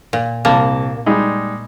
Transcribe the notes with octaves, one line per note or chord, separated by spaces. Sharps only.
A#2
C2 A#3 A5
G3 G#3 D#4